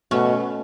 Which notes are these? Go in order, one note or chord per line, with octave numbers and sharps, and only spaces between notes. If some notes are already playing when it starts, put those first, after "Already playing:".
B2 A3 C#4